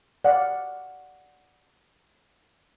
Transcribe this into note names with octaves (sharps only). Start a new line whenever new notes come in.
D5 F5 F#5